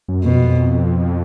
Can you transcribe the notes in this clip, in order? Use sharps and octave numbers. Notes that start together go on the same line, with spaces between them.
F#2
F2 B2